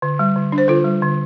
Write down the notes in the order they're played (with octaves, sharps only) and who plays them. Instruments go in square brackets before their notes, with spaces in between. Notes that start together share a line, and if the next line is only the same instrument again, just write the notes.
[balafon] D3
G3
D3
D4
C5
D3 F4 A4
G3
D3